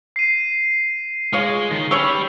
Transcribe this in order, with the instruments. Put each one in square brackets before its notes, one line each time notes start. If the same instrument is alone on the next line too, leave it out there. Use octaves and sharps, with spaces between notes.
[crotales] C7 D#7
[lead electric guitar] G#3 [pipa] F4 C#5
[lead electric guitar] D#3
[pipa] C#4 C#5 C#6 [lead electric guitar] G4 B5 [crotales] E6 F7